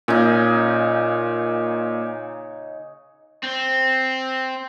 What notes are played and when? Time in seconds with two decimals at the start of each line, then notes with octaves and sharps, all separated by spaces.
0.08 A#2 C#3 D#4
3.44 C4